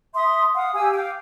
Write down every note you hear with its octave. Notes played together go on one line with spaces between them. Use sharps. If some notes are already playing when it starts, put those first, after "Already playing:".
E5 C6 D#6
F5 F#5 D#6
G4 F5 G#5 E6
F5 G5 D6